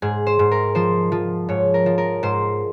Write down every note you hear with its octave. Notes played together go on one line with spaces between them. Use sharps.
G#2 G#4
C5
G#2
A#4
F3 C5
F3
G#2 C#5
A#4
F3
A#4
G#2 C5